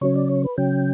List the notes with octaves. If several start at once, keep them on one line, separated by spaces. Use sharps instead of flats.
C#3 F#3 C#4 C#5
D5
C#5
B4
C#3 F#3 C#4 G5